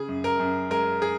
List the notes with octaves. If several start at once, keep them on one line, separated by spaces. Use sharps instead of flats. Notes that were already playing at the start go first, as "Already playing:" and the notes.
Already playing: C#3 G#4
F#2
A#4
F#2
G#3 A#4
G#4